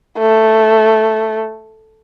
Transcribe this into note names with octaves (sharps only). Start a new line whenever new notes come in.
A3